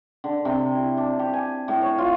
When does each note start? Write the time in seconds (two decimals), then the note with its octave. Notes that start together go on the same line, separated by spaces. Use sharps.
0.24 D3
0.45 C3
0.75 E4
0.97 D4
1.19 G4
1.33 G#5
1.68 A2
1.82 C#5
1.98 F4